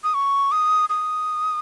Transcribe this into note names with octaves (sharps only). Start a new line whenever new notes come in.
D#6
C#6
D#6
D#6